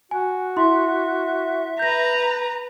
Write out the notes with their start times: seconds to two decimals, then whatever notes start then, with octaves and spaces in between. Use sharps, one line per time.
0.11 F#4 G#5
0.57 E4 E5 C6
1.79 B4 A#5 G6 A#6